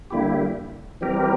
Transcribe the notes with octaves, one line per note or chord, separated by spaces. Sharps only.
D3 G3 A#3 E4 G4
E3 G3 C4 G4 A#4